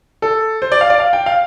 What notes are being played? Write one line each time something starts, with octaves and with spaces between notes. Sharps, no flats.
A4
C5
D5
F5
D5
F5
G5
F5